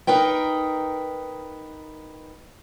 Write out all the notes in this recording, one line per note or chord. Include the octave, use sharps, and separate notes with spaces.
D#4 A#4 B4 G5